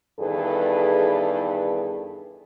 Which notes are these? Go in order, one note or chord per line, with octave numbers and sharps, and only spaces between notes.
E2 G2 D#3 G#4 A4 B4